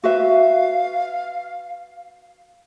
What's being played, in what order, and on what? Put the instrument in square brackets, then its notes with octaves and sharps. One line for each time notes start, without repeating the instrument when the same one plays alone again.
[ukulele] F#4 B4 E5 [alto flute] F5